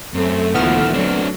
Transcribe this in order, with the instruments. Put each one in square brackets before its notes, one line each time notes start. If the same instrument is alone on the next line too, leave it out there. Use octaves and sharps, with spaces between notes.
[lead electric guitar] F#2 [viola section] A3 [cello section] C4
[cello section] D2 A#2 F3 [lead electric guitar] D#3 E4 [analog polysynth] B3 F6 E7
[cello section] F#3 [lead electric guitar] C4 D4